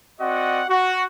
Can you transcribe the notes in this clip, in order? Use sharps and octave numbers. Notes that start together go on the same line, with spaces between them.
C4 F#4 D5 D#5 F#5
F#4